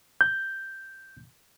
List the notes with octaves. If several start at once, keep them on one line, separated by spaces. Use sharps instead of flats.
G6